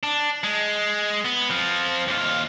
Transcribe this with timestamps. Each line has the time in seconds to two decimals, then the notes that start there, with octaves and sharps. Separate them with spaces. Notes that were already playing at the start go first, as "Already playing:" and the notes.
0.03 D4
0.44 G#3
1.25 B3
1.50 F3 C4
2.08 D#2 F4